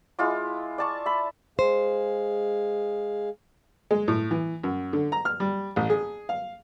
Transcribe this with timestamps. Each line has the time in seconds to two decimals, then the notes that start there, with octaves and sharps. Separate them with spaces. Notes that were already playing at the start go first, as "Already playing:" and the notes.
0.19 G#3 E4 F4 D6
0.78 D5 A5 C#6
1.06 E5 B5
1.59 G#3 G#4 C5 F5
3.91 G#3
4.08 A2
4.31 E3
4.64 F#2
4.93 D3
5.12 A#5
5.25 F6
5.40 G3
5.76 A1
5.90 G#4
6.29 F5